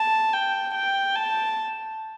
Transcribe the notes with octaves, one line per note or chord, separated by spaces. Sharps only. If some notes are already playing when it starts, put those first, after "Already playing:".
Already playing: A5
G5
G5
A5